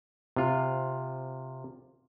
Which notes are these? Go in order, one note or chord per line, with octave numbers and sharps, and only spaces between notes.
C3 F4